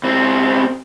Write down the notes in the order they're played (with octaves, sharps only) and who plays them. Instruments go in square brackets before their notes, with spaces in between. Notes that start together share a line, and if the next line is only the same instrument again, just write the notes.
[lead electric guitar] C#2 C4